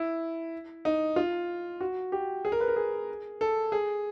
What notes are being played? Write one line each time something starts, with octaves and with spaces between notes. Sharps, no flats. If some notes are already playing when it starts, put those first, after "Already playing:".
Already playing: E4
D#4
F4
F#4
G4
G#4
A#4
B4
A#4
G#4
A4
G#4